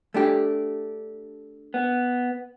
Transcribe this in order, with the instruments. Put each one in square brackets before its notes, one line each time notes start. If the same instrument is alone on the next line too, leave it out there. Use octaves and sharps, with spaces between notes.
[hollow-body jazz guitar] A3 D4 G4
[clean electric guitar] B3